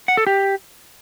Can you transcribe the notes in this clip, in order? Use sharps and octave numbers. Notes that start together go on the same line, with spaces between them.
F#5
A4
G4